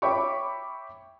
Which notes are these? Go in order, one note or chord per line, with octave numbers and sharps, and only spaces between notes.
C#5 E5 G5 B5 C#6 D6